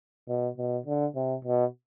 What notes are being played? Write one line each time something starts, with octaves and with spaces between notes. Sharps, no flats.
B2
B2
D3
C3
B2